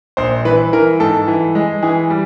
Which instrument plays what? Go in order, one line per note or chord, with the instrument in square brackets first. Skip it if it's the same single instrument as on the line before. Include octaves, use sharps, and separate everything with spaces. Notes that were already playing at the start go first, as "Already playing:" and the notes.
[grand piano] A#1 C5
E3 B4
E3 A#4
G#2 A4
E3
G#3
E3 G#4
G3